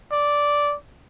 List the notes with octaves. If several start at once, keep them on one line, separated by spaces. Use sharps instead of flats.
D5